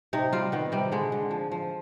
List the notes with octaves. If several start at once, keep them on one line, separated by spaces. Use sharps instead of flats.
C3 D#4
G3 F4
D#3 B3
C3 G3
D3 G#3
D3
F3
F3